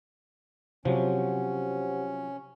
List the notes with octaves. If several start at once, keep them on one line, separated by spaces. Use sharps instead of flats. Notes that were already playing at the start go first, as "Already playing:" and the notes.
C3 F3 F#3 C#4 G4 C5 F#5